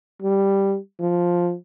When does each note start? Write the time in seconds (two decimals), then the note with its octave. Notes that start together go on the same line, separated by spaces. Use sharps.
0.22 G3
1.00 F3